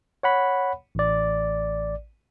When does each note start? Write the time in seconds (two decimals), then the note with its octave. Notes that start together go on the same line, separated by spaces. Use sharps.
0.23 C#5 F#5 B5
0.95 A1 D5